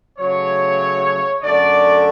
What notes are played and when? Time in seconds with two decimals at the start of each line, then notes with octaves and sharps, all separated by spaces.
0.18 C#3 F#3 A3 C#5
1.42 F#2 D3 A3 D5